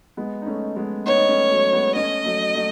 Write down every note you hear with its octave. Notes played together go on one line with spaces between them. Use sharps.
G#3 B3
D#4
A3 C#4
G#3 B3
B3 D#4 C#5
D#4
A3 C#4
F#3 A3
G#3 B3
A3 C#4 D#5
F#3 A3
F#3 A3